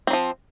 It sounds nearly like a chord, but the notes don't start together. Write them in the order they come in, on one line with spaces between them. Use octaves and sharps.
C4 F#3 F3